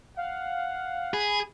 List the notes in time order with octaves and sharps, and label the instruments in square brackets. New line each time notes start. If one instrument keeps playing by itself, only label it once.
[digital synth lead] F5 [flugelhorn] F#5
[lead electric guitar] G#4 [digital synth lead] B5